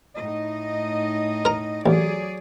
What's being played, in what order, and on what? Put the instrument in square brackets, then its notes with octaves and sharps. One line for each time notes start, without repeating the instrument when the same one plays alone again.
[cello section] A2 D#4 D#5
[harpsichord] A#4 A#5
[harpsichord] A1 [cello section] F#3 G#4 D5